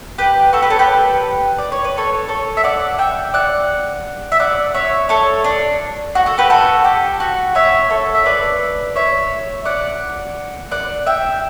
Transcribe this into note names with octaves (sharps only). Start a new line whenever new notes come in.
G4 B4
F#4 A4
G4 B4
A4 C#5
G4 B4
D5
C#5
B4
A4 C#5
A4 C#5
E5
D5 F#5
E5 G5
D5 F#5
E5
D5 F#5
C#5 E5
A4 C#5
D4
F#4
F#4 A4
G4 B4
F#4 A4
G4
F#4
C#5 E5
A4 C#5
E5
B4 D5
C#5 E5
D5 F#5
D5 F#5
E5 G5